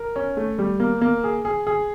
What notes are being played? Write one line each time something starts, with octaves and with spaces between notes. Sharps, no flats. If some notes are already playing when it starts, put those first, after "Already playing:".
Already playing: A#4
C#4
A3
G3
A#3
A#3
G#4
G#4
G#4